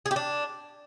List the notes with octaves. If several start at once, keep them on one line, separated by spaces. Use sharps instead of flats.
G#4
G4
D4